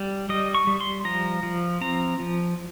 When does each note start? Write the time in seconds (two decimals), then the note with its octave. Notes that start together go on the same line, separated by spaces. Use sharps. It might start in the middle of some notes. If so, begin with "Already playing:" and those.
Already playing: G3
0.29 G3 D#5
0.55 C#6
0.67 G3
0.80 C6
1.05 F3 A#5
1.43 F3
1.81 C4 A#5
2.20 F3